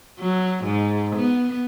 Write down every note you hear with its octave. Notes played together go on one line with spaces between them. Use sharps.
F#3
G#2
B3